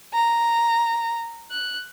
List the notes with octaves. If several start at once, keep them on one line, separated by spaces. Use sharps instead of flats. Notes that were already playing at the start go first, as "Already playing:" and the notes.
A#5
F#6